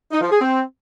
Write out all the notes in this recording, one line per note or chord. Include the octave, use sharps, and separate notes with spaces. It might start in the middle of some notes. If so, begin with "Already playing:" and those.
D#4
F3
G#4
C4